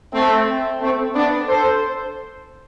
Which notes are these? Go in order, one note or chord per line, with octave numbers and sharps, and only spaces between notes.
A3 C4
A3 C4
B3 D4
A4 C5